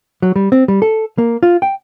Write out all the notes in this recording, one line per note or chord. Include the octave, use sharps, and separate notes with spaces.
F#3
G3
C4
G3
A4
A#3
F4
G5